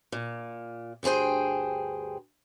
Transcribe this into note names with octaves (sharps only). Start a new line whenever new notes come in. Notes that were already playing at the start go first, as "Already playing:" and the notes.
A#2
D2 G2 G#4 C5 G5